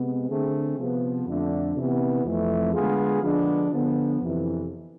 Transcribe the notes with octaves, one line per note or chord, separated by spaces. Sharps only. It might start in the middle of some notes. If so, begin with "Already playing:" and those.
Already playing: C3 G#3 B3
D3 A3 C4 G#4
C3 F3 B3
F2 D3 A3 D4
C3 E3 B3
F2 E3 A3
D3 G#3 B3 F4 G#4
D3 F3 G#3 B3 D4
D3 F3 B3
F2 C3 E3